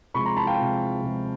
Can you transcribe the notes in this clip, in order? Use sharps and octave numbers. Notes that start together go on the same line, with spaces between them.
C3 F3 G#3 B5 C#6
A#5 C6
A5 B5
F5 G5
C3 F3 G#3
C3 F3 G#3